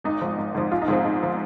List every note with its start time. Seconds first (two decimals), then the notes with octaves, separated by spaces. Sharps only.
0.04 G#1 D#4
0.22 G#2 F3
0.38 G#1
0.54 G#2 F3
0.72 A#1 F4
0.82 D#4
0.88 G#2 F3 C4
1.04 A#1 D#4
1.23 F3